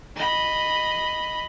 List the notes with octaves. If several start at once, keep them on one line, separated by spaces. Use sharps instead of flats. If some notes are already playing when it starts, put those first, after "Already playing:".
D#5 B5